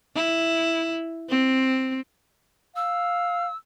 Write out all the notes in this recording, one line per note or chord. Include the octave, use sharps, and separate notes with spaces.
E4
C4
F5 E6